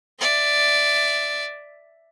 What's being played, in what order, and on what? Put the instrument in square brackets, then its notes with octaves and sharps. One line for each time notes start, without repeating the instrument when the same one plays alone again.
[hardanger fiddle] D5 E5